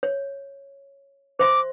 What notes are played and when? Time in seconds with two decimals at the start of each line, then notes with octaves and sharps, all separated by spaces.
0.03 C#5
1.39 C5 E5 C6 D6